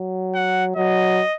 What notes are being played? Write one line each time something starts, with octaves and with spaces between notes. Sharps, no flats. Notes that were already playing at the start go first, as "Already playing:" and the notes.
Already playing: F#3
F#5
F#3 D#5